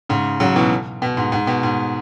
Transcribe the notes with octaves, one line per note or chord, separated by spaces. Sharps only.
G#2 C#3
C#3 F#3
B2 E3
B2
G#2
G#2
B2
G#2